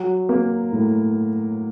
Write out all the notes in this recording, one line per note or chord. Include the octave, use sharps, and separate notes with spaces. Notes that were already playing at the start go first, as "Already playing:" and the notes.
Already playing: F#3
A#3
A2